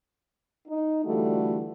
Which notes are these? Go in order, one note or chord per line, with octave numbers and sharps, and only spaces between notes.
D#4
D3 E3 G3 A3 F4 F#4